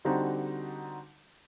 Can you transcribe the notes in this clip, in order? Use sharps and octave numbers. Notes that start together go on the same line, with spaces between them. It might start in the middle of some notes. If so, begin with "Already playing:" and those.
D3 G3 C4 D#4 F#4